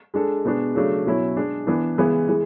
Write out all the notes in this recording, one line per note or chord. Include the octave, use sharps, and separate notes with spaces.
G#3 D4 A4
B2 G#3 B3 D4
C#3 F#3 A3 D4
B2 F#3 C#4 E4
G#3 D4 G#4
E3 B3 D4
C#3 E3 G#3 B3 E4
E3 G#3